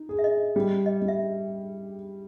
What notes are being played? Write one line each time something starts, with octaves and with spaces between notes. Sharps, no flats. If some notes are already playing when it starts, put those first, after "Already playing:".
Already playing: D#4
G#4
E5
D#5
G3
D#5
G3
E5